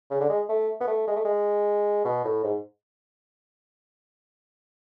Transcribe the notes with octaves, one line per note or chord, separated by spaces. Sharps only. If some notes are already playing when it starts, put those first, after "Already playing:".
C#3
D3
G#3
A3
B3
A3
G#3
A3
G#3
B2
A2
G#2